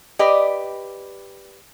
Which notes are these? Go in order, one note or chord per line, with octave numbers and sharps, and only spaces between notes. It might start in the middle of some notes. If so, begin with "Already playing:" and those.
G4 B4 D5 D#5